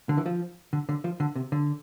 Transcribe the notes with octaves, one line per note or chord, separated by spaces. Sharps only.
D3
E3
F3
D3
D3
F3
D3
C3
D3